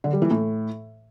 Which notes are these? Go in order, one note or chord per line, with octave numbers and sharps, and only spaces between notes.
D3
G3
E3
A2